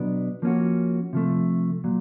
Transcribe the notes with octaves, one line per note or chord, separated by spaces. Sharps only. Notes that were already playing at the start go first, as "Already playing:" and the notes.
Already playing: B2 F#3 B3 D4
F3 A#3 C#4 F#4
C3 F3 A3
A#2 F#3